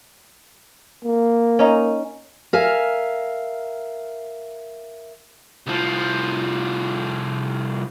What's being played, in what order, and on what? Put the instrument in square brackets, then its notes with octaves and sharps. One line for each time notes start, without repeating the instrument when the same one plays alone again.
[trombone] A#3
[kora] C#4 D#4
[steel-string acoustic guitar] A#4 E5 F5 G#5
[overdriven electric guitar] C2 F3